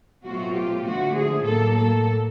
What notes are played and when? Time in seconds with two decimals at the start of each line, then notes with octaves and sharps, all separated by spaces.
0.23 B2 F#3 A3 C4 F4 F#4
0.54 G4
0.84 D3 F3 A3 F#4
1.15 G#4
1.45 A2 F#3 A#3 A4
1.76 A4